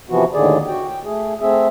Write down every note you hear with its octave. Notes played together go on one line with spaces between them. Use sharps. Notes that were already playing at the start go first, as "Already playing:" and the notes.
C3 E3 F3 B3 F#4
D#2 A2 D3 D#3 G#4 D5
F#4 G5
G5
A3 G#4
A3 C4 G#4 E5